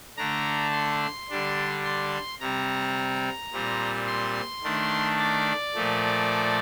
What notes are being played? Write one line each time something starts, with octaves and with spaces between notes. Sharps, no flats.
D3 A3 D4 A#5
C6
D3 G3 D4
C6
C3 G3 C4 A#5
A#2 G3 C4
C6
D#3 A3 D4
D5
A#2 F3 A3